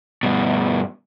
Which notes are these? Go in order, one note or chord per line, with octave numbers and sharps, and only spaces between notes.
G2 B2